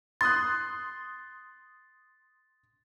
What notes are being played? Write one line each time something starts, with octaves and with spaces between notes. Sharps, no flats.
C6 D#6 F#6 A6